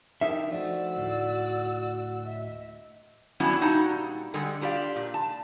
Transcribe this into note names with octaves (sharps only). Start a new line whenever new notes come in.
D3 C#4 D#4 G4 A#4 E5
F3 A3 F#4 D5 E6
D2 A2 D5
D#5 E5
F#3 G3 B3 C#4 D4 E4
A#2 G3 D#4 F#4 A5 A#5
D3 G3 G#3
D4 F4 G4 D5 F5
A#2
A5